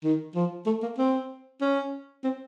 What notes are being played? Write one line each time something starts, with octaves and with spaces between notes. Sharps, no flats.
D#3
F3
A3
A#3
C4
C#4
C4